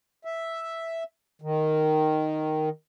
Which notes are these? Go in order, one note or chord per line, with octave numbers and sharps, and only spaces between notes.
E5
D#3